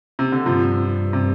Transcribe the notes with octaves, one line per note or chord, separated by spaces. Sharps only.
C3
D3
G2 C3 F3
C3